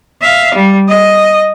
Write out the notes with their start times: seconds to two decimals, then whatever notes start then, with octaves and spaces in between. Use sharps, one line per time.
0.21 E5 F5
0.54 G3
0.88 D#5